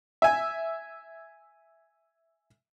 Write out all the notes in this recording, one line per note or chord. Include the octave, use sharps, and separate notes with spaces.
E5 G#5